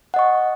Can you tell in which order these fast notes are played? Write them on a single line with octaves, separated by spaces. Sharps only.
F#5 D#5 C#6